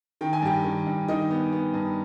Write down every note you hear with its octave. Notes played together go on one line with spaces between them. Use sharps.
D#3 G5
G#5
G2 G4 G5
D#3
G2
D#3 D#4 D#5
B3
B3
G2